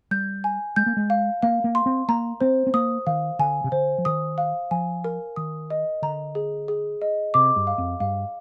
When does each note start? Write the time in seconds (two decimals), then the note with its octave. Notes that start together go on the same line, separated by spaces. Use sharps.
0.11 G3 G6
0.44 G#5
0.76 G#3 G6
0.86 A#3
0.97 G#3
1.10 F5
1.43 A#3 F5
1.64 A#3
1.75 C6
1.86 C4
2.09 A#3 A#5
2.41 C4 C5
2.67 C4
2.74 A#3 D#6
3.07 D#3 F5
3.39 D3 G#5
3.64 C3
3.72 D3 C5
3.98 F3
4.05 D#3 D#6
4.38 F5
4.71 F3 G#5
5.04 A#4
5.36 D#3 D#6
5.70 D#5
6.02 D3 A#5
6.35 G#4
6.68 G#4
7.02 D#5
7.34 C3 D6
7.56 G2
7.67 F5
7.78 F2
8.00 G2 F5